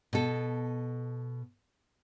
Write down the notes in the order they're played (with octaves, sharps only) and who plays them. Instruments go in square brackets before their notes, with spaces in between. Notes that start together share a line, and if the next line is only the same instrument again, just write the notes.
[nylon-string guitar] B2 A4